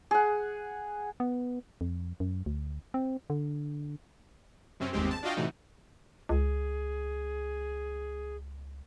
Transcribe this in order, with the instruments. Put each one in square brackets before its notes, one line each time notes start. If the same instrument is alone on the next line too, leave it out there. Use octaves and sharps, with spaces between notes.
[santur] G#4 F#5
[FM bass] B3
F2
F#2
D2
C4
D3
[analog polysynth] F#2 C3 C4 C#4
G1 D#2 G#3 C4 G4
A5
D4 F4 F#4 D#5 F5 G5
A2 C3 E3 D#4 F#4
[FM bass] C#2 [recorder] G#4